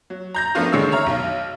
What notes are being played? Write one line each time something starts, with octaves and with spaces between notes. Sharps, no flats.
F#3
A#5 G6 A#6
F3 A3 B3 D4 F4 F#4
D3 D#3 G#3 C#5 E6
C#5 E5 A#5 F6
B1